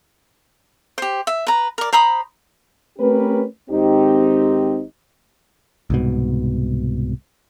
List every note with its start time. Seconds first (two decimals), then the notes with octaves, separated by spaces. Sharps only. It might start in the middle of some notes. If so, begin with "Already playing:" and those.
0.98 G4 C5
1.27 E5
1.47 B4 A#5
1.78 A#4 D5
1.93 C5 A#5 B5 D#6
2.99 A3 C4 C#4 G4 A#4 B4
3.70 G#1 C4 D#4 G4
5.90 C2 G#2 B2